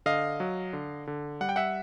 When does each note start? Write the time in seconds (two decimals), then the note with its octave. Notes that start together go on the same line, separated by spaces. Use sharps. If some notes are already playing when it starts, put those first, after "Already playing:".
0.06 D3 D#5 F5
0.40 F#3
0.73 D3
1.07 D3
1.41 G3 F#5
1.49 G5
1.56 E5 F#5